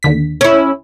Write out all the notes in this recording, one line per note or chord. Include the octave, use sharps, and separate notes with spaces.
D#2 D3 B6
C#4 E4